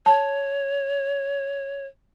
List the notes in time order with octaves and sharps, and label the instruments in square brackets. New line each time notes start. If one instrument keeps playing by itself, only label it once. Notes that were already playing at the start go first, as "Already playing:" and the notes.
[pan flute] C#5 [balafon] A5